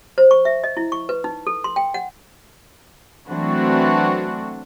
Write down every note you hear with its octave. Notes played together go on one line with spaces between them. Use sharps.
C5
C#6
E5
D#5
E4
C#6
B4
D#4
A4
C6
G5
F#5
E3 F#3 A3 C4 D4 F#4